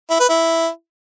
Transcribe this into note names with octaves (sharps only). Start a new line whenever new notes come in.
E4
B4
E4